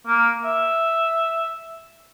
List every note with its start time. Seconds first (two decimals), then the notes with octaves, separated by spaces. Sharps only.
0.07 A#3
0.44 E5